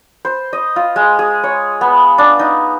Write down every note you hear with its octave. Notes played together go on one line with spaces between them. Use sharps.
C5
D#5
F4
G#3
G#4
C#5
B3
D4
D#4